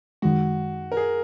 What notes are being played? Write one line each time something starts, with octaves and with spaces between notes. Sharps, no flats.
F#2 D#3 G#3 F#4
A#4
G#4